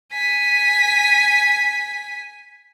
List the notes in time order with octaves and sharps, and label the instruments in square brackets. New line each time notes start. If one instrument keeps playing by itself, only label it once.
[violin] G#5 B6